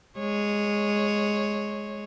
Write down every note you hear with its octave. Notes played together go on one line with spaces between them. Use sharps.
G#3 C#5